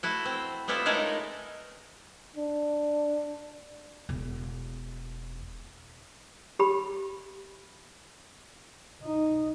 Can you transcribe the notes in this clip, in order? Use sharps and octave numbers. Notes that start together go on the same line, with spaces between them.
A3 E4 F#4
C4
G3 B3 C4 E4 F4 A4
G#3 A3 D#4 A#4 C#5
D4
E1 B3
G4 B5
D#4